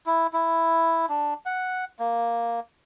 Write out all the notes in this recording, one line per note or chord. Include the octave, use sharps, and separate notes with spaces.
E4
E4
D4
F#5
A#3